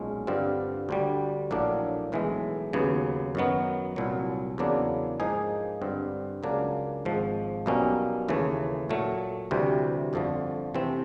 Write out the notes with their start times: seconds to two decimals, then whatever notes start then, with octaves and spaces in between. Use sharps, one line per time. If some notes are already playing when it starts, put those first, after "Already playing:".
Already playing: B1 A#2 F3 G#3 C#4
0.27 G2 D3 G3 C4 F4
0.89 D2 D3 G3
1.51 A#1 A2 F#3 A#3 D4
2.12 B1 A2 E3 G#3
2.73 D#2 C#3 F#3 B3
3.35 F#2 D#3 F#3 B3
3.96 C2 A#2 F#3
4.58 E2 C#3 F#3 A#3 D4
5.20 G#2 F3 A#3 D#4 G#4
5.81 G2 D3 G3 C4
6.43 C#2 C#3 F#3 A#3 D4
7.05 G#1 G#2 F3
7.66 B1 B2 G3 A#3 C#4
8.29 D#2 C#3 E3 A3
8.89 A#2 F#3 A3
9.51 D2 C3 E3 G3
10.13 G1 F2 D3 F3 A3
10.74 C3 E3 A3 C4